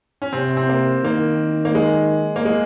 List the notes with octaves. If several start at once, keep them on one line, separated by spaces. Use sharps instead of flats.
C#4
C3 C4
C4
A#3
D#3 A#3
A#3
G#3
A#3
G#3